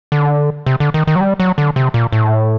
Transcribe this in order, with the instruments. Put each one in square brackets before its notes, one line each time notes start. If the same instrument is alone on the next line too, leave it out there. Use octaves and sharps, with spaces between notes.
[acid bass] D3
C3
D3
D#3
D#3
F#3
G3
F#3
D3
C3
A#2
A2